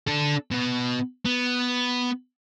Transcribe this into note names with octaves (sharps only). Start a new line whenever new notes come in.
D4 A4
B2 B3
B3